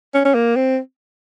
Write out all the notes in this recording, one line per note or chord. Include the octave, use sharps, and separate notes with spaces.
C#4
C#4
A#3
C4